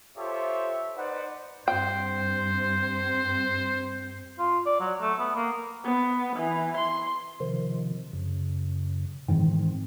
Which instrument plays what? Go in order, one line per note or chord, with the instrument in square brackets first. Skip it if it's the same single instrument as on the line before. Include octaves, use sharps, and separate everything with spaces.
[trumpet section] F4 G4 A4 C5 C#5 E5
D#4 B4 C5 D5 F#5
[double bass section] G2 C4 [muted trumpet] C5 [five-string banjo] G5
[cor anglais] F4
D5
F#3
A3
B3
A#3
[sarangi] B3
E3
C6
[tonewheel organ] C3 D#3 F3
F#2 C#3
[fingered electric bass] G#2 D#3 E3 [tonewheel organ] C4